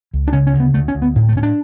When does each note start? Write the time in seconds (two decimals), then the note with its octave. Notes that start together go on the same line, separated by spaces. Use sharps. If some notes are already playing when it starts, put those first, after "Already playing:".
0.13 C#2
0.28 D4
0.33 C#3 C#4
0.47 C#4
0.53 D2
0.60 B3
0.74 D2 A3
0.88 C#4
0.95 D2
1.02 B3
1.16 A2
1.29 A3
1.35 A2 C#4
1.43 D4